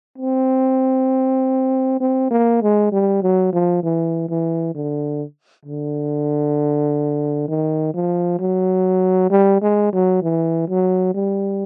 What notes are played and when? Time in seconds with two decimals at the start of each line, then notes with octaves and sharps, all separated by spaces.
0.18 C4
2.00 C4
2.31 A#3
2.62 G#3
2.92 G3
3.22 F#3
3.53 F3
3.83 E3
4.29 E3
4.75 D3
5.65 D3
7.48 D#3
7.94 F3
8.39 F#3
9.31 G3
9.62 G#3
9.93 F#3
10.22 E3
10.69 F#3
11.14 G3